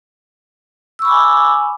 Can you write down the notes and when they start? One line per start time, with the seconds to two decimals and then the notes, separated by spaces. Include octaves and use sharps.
0.99 E6
1.02 C#6
1.05 B5
1.08 D6
1.11 G#5